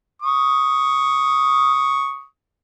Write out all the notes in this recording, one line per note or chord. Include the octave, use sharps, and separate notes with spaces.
C#6 D#6